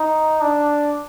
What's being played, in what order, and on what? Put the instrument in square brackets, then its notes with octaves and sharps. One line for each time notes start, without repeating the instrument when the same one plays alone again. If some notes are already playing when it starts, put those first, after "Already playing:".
Already playing: [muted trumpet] D#4
D4